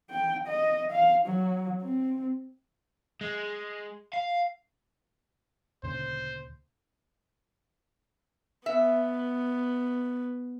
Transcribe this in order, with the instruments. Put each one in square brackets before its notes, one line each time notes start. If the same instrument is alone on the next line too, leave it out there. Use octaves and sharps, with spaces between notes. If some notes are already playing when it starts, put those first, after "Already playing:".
[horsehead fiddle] G5
D#5
F5
F#3
C4
[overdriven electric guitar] G#3
F5
[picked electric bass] D2 A#2 C#3 [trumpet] C5
[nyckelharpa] B3 [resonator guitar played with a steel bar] E5